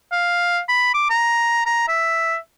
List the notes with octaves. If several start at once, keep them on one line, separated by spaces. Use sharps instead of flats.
F5
B5
D6
A#5
A#5
E5